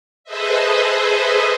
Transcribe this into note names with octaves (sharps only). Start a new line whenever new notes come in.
G#4 A4 B4 C5 D#5 E5